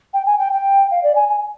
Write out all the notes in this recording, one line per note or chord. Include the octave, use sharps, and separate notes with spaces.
G5
G#5
G5
G5
F5
D5
G#5
G#5